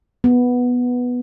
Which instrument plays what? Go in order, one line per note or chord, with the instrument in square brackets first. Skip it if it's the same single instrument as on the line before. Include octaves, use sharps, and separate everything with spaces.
[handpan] B3